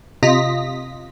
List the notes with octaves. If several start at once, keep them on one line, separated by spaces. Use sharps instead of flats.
C3 F4 D#5 A#6 B6